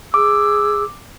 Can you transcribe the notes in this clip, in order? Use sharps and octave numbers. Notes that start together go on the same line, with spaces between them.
G#4 D6 E6